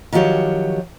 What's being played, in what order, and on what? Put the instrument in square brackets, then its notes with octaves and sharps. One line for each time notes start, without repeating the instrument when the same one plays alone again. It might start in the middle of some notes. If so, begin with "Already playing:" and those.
[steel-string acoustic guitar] D#3 F3 F#3 G4 C#5